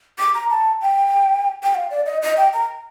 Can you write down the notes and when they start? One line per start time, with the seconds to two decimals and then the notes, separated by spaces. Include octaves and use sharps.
0.19 D6
0.35 A#5
0.50 A5
0.81 G5
1.63 G5
1.75 F5
1.91 D5
2.06 D#5
2.22 D#5
2.37 G5
2.53 A#5